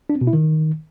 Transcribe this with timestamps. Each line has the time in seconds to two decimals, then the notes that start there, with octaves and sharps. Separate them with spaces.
0.10 D4
0.15 C4
0.21 B2
0.27 E4
0.33 D#3